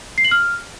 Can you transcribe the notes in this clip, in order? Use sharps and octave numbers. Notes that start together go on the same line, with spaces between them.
C7
F#7
F6